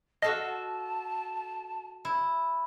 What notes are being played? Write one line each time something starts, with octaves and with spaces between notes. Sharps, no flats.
F#4 A4 D#5 F5 A5
E4